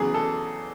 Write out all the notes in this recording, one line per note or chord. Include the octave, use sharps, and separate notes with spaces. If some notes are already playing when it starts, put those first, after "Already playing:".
Already playing: E2 C#3 F#3 B3 G#4
A4